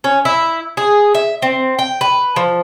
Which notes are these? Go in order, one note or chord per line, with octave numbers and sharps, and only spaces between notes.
C#4
E4
G#4
E5
C4
G5
B4
F3